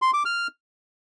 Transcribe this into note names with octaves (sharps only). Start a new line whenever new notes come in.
C6
D6
F6